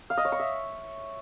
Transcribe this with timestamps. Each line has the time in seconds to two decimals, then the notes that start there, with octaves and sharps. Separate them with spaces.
0.10 F5
0.17 D#5
0.25 C#5
0.32 C#6
0.40 E5